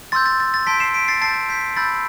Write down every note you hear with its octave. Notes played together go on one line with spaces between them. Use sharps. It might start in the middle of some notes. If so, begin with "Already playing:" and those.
C6 E6 G6 A6
A6
A6
A6
A5 C6 G6 B6 D7
C7 E7
B6 D7
A6 C7
A5 E6 G6 A6 C7
G6 B6
B5 E6 G6 A6